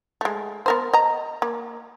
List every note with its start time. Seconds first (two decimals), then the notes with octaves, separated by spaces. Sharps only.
0.21 G#3 A3
0.66 B3 A#4 C5
0.94 D#5 A#5
1.42 A#3